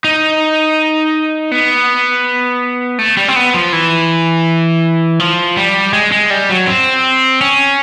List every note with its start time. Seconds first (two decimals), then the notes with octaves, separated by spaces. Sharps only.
0.04 D#4
1.51 B3
2.99 A3
3.17 G3
3.28 C4
3.36 B3
3.54 F3
3.73 E3
5.20 F3
5.57 G3
5.93 G#3
6.12 G#3
6.30 G3
6.49 F#3
6.67 C4
7.41 C#4